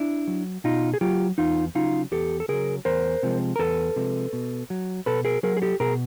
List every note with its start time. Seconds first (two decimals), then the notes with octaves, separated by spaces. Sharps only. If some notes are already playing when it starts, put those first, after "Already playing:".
Already playing: D4 E4
0.27 F#3
0.64 B2 D#4 F4
0.94 G#4
1.01 F#3 F4 G4
1.38 E2 D#4 F4
1.75 C#3 F#3 D#4 F4
2.12 E2 G4 A4
2.40 A4
2.48 C#3 F#3 G#4 A#4
2.85 E2 A#4 C5
3.23 C3 F3 G#3
3.56 A#4
3.59 E2 A4 B4
3.96 C3 F3 G#3
4.33 B2
4.70 F#3
5.06 B2 A4 B4
5.25 G#4 A#4
5.43 F#3 G#4 A#4
5.57 G#4
5.62 G4 A4
5.80 B2 G#4 A#4